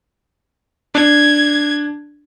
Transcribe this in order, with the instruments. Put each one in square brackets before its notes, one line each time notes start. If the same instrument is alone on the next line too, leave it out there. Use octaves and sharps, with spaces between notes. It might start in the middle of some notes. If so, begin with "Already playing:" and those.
[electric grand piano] D4 [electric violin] G#6